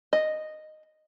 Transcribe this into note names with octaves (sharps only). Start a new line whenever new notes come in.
D#5